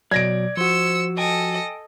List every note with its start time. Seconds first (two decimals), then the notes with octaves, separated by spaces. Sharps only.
0.11 B2 F#3 D5 G#6 A#6 D7
0.57 F3 F#4 C5 E6 C#7
1.18 A4 D#5 G5 G#5